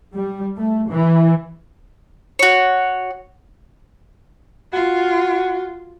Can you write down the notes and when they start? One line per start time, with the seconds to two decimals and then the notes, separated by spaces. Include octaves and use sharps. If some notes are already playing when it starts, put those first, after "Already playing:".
0.14 G3
0.57 A3
0.89 E3
2.39 F#4 C#5
4.73 F4 F#4